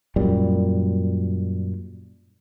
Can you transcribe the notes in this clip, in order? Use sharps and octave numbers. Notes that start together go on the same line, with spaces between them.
F#2 A#2 G3